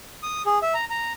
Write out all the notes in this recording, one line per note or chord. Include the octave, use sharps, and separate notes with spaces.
D#6
G#4
E5
A#5
A#5